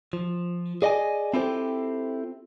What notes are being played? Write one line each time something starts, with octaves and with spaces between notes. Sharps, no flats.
F3
G#4 D5 D#5 F#5 G#5
C4 E4 F4 G4 A4 C5